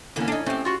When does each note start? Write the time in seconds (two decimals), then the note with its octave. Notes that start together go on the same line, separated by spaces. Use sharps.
0.16 E2 D3 E3 A#3 C#4
0.28 D4 D#4
0.46 A2 C4 C#4 G4
0.65 F4 F#4